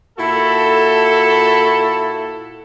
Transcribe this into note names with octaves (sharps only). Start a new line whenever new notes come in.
A#2 E4 F#4 A4